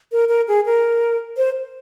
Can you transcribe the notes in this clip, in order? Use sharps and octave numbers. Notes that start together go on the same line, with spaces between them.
A#4
A#4
G#4
A#4
C5